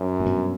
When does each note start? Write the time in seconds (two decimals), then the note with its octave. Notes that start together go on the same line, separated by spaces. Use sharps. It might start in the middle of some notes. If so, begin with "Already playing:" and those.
Already playing: F#2
0.20 A2
0.25 G2 B2